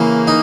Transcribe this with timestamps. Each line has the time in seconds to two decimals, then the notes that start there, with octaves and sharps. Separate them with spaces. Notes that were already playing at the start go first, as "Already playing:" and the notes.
Already playing: C#3 E3 A#3
0.27 D#4